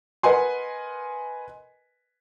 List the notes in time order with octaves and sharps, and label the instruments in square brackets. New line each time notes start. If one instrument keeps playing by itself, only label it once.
[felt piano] A#4 B4 D#5 F#5 G#5 C6